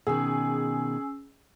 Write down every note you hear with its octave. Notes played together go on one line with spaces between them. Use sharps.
B2 D#3 C#4 G#4 E6